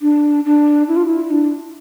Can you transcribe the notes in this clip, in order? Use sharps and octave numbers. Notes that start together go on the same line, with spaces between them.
D4
D4
E4
F4
E4
D4